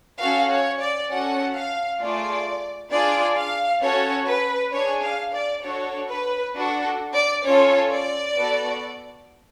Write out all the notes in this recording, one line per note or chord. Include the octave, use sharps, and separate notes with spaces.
C#4 F#4 A4 F5
C#5
D5
C#4 F#4 A4 F#5
F5
A3 F4 G#4 D5
D4 F4 G#4 D5
F5
C#4 F#4 A4 C#5
B4
D4 G#4 C#5
F5
D5
D4 F#4 A4 C#5
B4
D4 F#4 A4
D5
C#4 F4 A4 C#5
D5
B3 F#4 A4